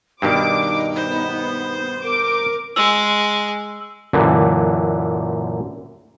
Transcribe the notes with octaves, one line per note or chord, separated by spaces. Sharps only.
G2 B2 D#3 D4 D#4 D6
B3 C5
A#4 D6
G#3 E6 F#7
F#2 A#2 D3 E3